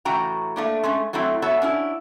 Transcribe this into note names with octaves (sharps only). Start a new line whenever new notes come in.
A2 C#3 E3 F#4 G5 A#5
A3 A#3 D4
G#3 A3 C#4
F#3 A3 C4 E4 F#4
B3 F#4 A4 C#5 E5
C#4 D4 E4